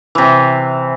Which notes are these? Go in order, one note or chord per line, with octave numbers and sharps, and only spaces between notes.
C3 E3